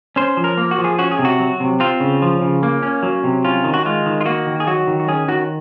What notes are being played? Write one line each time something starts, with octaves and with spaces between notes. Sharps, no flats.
C#4 C5
F3
A#4
A#3
F#4
F3
G#4
C#4 F#4
G#4
C3
F#4
F#3
C3
C4 F4
C#3
F3
C#3
A#3
C#4
F#3
C3
C#4 F4
D#3
F#4
G#3 F4
D#3
F4
A#3 F#4
D#3
G#4
F#3 F#4
D#3
F#4
C#4 G#4
D#3 F#4